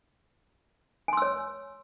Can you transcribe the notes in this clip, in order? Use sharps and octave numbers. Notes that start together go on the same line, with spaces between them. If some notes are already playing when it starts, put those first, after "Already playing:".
C#5 G#5 C6 E6